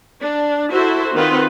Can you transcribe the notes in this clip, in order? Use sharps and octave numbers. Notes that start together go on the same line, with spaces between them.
D4
E4 F#4 A4 C5 E5
D#3 C4 D#4 F4 B4 F#5